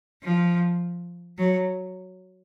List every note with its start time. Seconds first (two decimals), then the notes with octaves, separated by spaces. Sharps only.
0.23 F3
1.38 F#3